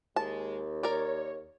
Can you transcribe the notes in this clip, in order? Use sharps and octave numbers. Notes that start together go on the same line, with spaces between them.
D#2 G#3 A5
A#4 C#5 D5